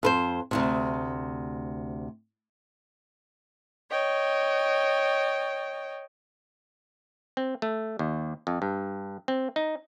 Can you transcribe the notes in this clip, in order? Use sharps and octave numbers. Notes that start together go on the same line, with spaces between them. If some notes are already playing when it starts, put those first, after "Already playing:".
F2 B4 C5
D2 G#2 C3
C#5 D#5 G5
C4
A3
D#2
F2
G2
C4
D#4